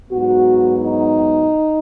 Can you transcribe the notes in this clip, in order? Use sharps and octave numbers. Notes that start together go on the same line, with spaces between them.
G#2 F#3 B3 F#4
D#4